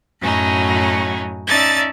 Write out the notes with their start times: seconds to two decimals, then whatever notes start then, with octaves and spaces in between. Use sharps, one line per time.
0.20 F#2 A2 F#3 C#4 D#4
1.46 C#4 D#4 D5 E5 A5 A6